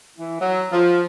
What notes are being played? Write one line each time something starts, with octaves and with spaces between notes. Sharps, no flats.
E3
F#3
F3